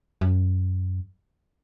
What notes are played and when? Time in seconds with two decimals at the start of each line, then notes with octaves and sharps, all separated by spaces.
0.21 F#2